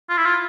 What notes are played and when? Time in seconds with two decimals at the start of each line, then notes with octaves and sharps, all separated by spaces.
0.09 F4
0.17 E4
0.25 F4